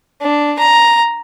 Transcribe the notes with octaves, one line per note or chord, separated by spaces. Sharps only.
D4
A#5